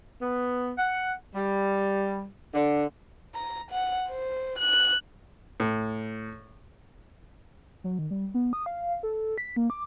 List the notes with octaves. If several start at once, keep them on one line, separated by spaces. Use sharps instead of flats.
B3
F#5
G3
D3
A#5
F#5
C5
F#6
A2
F#3
D#3
G3
B3
D#6
F5
A4
B6
A#3
D6